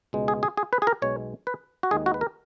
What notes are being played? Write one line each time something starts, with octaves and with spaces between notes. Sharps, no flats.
C#2 B2 G#3
G#4
G#4
G#4
B4
G#4
A#4
B1 B2 G#3 C#5
B4
F#4
D#2 D#3 G#3 G#4
F#4
B4
A#4